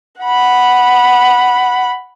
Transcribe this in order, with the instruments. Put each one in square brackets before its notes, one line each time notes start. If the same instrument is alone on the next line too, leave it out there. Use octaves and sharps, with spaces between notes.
[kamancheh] F#5 B5